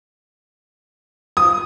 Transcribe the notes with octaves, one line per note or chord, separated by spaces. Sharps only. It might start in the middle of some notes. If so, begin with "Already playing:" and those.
D#6